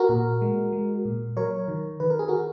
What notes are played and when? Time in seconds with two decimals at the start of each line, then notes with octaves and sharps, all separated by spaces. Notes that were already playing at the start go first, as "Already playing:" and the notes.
Already playing: F#4 A#4
0.09 A#2
0.42 G#3
0.73 G#3
1.05 A#2
1.37 F#3 A#4 C#5
1.68 D#3
2.00 D#3 B4
2.10 A#4
2.19 G#4
2.28 F#4 A#4